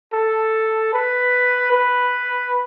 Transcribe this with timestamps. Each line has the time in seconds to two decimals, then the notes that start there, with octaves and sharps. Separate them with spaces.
0.13 A4
0.93 B4
1.72 B4